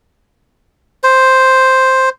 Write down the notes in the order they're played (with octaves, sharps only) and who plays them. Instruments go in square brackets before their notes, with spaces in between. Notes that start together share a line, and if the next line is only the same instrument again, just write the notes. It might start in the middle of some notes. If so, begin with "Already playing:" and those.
[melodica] C5